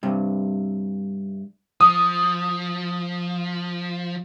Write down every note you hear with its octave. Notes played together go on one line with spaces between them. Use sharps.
G2 C3
F3 D#6